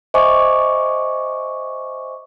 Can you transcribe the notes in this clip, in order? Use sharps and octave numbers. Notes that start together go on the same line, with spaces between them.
C5 D#5 E5 G#5 C#6 D6